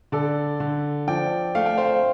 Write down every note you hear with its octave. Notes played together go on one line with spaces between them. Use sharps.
D3 A4 D5
D3
F3 D5 G5
A3 F5
G5
C5 F5